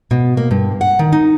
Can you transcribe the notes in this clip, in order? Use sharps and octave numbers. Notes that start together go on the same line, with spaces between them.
B2
A#3
G2
F#5
D#3
D#4